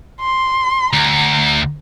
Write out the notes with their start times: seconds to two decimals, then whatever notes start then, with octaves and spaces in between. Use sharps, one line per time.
0.21 C6
0.93 D2 A#5